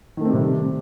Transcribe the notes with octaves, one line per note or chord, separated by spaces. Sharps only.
C3 D#3 G3 A3 C4